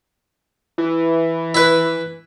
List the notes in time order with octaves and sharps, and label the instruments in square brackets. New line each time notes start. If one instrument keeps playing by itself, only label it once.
[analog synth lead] E3
[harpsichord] E4 B4